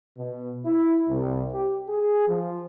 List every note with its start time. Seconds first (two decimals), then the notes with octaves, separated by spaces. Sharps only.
0.18 B2
0.66 E4
1.09 C2
1.52 G4
1.88 G#4
2.28 F3